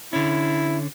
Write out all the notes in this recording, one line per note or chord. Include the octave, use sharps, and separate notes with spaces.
D3 C#4 E4